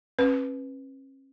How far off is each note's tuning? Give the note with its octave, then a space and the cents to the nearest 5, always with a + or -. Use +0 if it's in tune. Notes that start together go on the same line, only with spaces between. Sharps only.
C#4 -45 B4 +0